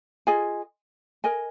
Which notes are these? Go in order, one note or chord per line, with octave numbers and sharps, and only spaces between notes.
F4 G#4 D#5 G#5
A#4 D#5 G#5